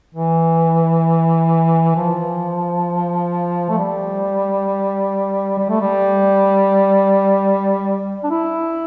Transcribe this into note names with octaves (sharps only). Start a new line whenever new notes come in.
E3
F3
A3
G3
G3
A3
G3
D4
E4